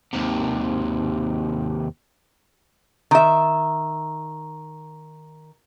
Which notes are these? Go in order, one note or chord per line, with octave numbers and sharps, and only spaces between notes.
D#2 C3
D#3 E5